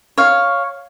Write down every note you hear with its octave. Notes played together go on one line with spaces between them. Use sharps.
C#5 F5